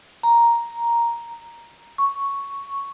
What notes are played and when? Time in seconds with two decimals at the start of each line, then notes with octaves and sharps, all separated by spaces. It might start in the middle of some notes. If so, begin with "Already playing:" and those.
0.23 A#5
1.98 C#6